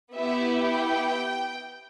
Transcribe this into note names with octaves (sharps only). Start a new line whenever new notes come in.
B3 E4 G4 E5
G5